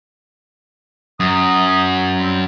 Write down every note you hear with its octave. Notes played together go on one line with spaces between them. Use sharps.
F#2 D#6
F#3 G3 C4